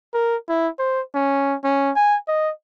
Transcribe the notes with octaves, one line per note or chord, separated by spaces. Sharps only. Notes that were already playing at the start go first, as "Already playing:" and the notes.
A#4
E4
C5
C#4
C#4
G#5
D#5